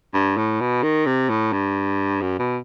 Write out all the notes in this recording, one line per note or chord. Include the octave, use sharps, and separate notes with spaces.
G2
A2
B2
D#3
C3
A2
G2
F#2
B2